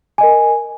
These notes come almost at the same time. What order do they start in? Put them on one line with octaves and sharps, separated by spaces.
G#5 D#5 A#4